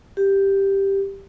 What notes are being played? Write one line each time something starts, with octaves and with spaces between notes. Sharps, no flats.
G4